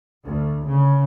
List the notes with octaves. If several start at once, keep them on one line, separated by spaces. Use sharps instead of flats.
D2
C#3